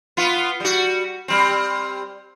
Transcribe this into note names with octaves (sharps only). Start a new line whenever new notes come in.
B3 F4
G3 F#4
G3 C4